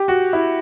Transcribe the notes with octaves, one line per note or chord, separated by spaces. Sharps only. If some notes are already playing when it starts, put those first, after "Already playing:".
Already playing: G4
F#4
E4